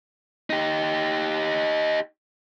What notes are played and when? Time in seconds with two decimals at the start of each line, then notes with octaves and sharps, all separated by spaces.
0.50 D#4 G4